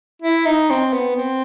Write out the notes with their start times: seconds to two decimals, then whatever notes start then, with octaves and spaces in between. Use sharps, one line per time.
0.22 E4
0.46 D#4
0.70 C4
0.93 B3
1.16 C4